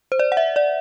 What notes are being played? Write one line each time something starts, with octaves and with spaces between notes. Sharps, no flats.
C5
D5
F#5
E5
D5